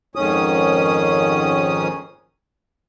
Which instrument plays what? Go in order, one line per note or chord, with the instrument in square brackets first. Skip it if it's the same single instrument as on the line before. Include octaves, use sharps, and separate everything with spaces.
[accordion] F2 G#2 D#3 C#4 D#6